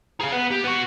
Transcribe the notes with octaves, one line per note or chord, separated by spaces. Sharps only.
G#4 F5
B3
G4
B3 F#4